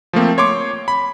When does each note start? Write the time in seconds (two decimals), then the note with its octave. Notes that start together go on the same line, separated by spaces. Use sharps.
0.13 F3 A3 A#3 C4
0.38 C#5 C6 D6
0.88 B5